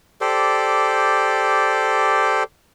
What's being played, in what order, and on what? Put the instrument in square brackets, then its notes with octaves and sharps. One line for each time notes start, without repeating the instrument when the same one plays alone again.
[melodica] G4 A4 C5 D5